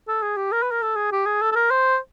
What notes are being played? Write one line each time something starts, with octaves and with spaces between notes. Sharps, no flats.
A4
G#4
G4
A#4
B4
A#4
A4
G#4
G4
G#4
A4
A4
A#4
C5